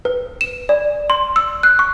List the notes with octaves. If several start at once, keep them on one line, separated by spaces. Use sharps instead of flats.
B4
E7
D5
C6
E6
F#6
C#6